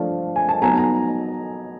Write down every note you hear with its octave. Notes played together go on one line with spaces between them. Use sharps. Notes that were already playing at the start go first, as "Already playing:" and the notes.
Already playing: F3 A3 D4 F4
G#5
A5
F#3 B3 D#4 G#5 A#5
A#5